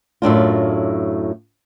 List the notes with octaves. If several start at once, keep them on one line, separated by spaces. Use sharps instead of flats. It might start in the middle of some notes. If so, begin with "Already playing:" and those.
F#2 A2 D4 F4